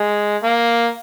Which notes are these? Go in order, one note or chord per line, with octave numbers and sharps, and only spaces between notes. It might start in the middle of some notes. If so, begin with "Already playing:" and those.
Already playing: G#3
A#3